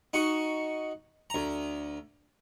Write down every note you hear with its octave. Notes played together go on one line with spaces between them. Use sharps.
D#4 F#4 C#6
D2 A#5